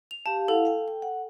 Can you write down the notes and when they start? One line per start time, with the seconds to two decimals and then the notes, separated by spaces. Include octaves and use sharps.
0.11 F7
0.26 G4 F5 A5
0.48 E4 A4 F5 F#5
0.65 F5 G5
0.88 G5
1.02 F#5